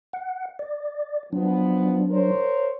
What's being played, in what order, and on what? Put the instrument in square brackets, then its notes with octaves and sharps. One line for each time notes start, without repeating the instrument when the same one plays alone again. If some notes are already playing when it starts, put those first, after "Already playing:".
[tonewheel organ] F#5
D5
[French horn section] F3 B3 [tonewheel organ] F#3 D4
[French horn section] A#4 C5 C#5